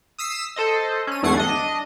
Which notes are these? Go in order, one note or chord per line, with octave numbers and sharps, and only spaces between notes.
D#6 E6 B6 C7
A4 C5 D#5
C#4 D#7
G#1 E2 A3 F#5 G#6 C7
D4 D#5